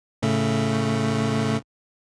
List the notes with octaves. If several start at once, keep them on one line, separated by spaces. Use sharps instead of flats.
A2 C#3 A3